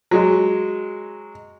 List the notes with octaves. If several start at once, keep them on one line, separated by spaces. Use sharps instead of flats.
F#3 G#3